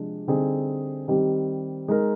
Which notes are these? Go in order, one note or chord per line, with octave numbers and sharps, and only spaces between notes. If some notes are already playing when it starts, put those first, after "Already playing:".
Already playing: C3 F3 G#3 D4
D3 G3 C4 D#4 G#4
D#3 G3 C4 G4
G#3 D#4 A#4